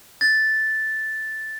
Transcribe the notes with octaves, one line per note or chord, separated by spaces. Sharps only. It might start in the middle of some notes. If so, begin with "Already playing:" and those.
A6